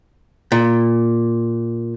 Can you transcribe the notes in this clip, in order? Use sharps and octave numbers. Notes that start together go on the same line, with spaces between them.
A#2